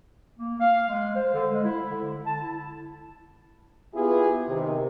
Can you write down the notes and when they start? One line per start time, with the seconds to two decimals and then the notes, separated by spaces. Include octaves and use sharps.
0.39 A#3
0.60 F5
0.89 G#3
1.16 C5
1.34 D3
1.51 G#3
1.64 E4
1.90 D3
2.27 A5
2.42 E4
3.94 B3 E4 F4 G4 G#4
4.48 C3 D#3